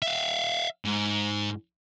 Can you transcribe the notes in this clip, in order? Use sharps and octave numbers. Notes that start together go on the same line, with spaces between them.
E5 F5
G#2